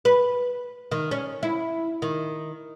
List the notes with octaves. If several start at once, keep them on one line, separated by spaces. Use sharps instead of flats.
B4
D#3
C#4
E4
D#3